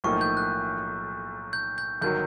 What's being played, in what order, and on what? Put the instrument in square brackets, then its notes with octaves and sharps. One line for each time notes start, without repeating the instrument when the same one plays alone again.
[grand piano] B1 A2 F3 A#3 D#4 [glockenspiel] C#6
[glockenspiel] G6
F#6
G6
G6
[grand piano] G1 D#3 F#3 [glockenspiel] G6